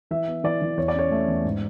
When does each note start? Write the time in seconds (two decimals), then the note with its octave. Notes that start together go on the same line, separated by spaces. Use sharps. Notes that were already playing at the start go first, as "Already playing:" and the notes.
0.11 E3 E5
0.28 B3
0.44 E3 D5
0.62 E3
0.77 E2 C#5
0.88 D5
0.94 C#4 C#5
1.11 A3
1.28 E2
1.44 G#2